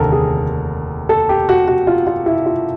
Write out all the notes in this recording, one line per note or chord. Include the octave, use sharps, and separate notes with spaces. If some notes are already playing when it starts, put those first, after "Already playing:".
Already playing: F1 D#2 D3 A4 A#4
G#4
A4
G4
F#4
F#4
F4
F4
E4
F4